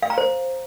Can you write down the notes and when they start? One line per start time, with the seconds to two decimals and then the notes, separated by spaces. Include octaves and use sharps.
0.03 F5
0.10 A#5
0.18 C5